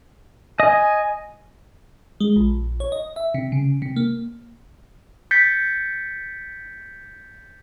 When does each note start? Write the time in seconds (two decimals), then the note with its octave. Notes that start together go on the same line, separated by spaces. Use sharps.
0.60 D#5 G#5
2.20 G#3
2.36 A#1
2.80 C#5
2.92 D#5
3.16 E5
3.34 C3
3.52 C#3
3.82 C3
3.96 A#3
5.31 G6 A6 B6 C#7